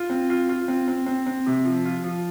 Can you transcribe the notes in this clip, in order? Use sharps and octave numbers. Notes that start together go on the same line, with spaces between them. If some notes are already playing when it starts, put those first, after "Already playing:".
Already playing: F4
C4
F4
F4
C4
C4
C4
C4
C3
F3
F4
F3